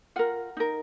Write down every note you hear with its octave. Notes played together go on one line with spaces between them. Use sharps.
F4 A#4 F#5
D#4 A#4